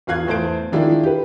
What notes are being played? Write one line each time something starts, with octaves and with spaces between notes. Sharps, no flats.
E2 F4 F5 F#6 G#6
E2 A3 C5 A5 D7
D#3 G#3 D4 E4 F4
G4 B4